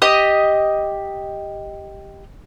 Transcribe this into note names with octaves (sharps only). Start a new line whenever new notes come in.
G4 D#5 D#6